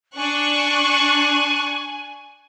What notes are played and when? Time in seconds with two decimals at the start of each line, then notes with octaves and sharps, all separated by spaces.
0.16 D4 G#5 C#6 F#6